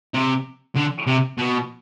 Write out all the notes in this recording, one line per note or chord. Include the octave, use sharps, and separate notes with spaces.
C3
D3
C3
B2